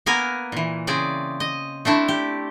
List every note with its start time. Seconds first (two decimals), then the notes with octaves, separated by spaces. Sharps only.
0.06 A#3 B3 A#4 G#5
0.52 A#2 E3
0.87 C#3 C4 G#4 D5
1.40 D#5
1.85 A3 C4 D4 E4
2.08 G4